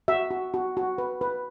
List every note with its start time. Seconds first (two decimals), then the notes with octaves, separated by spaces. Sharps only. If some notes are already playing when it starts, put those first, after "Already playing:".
0.08 F#4 E5
0.31 F#4
0.54 F#4
0.77 F#4
0.98 B4
1.21 B4